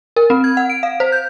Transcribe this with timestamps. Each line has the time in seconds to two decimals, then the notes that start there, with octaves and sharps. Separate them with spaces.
0.16 A#4
0.30 C4
0.44 G#6
0.57 F#5
0.70 D7
0.83 F5
1.00 C5
1.12 G6